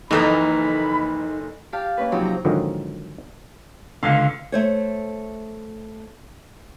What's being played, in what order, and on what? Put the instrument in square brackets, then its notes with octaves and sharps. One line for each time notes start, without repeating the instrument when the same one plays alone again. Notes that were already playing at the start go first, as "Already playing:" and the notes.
[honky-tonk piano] F#1 A4 A#5 [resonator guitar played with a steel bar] F2 E3 D#5 [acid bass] D#4 [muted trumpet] B5
[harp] G4 F5 A5
A#3 C#4 B4
C3 F3 F#3 C4 D#4 G4
A#5
[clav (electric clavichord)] G#2 D3 D#3 F3 F#3 C4
[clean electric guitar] C#2 D3 [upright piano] F5
[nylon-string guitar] A3 C5 C#5